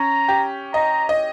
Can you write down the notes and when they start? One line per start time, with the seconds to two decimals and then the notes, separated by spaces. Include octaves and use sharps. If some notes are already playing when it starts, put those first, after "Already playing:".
Already playing: C#4 A#5
0.28 G4
0.74 D#5 A#5
1.09 D#5